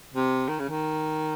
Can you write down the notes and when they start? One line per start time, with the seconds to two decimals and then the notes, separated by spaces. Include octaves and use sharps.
0.14 C3
0.48 D#3
0.59 C#3
0.69 D#3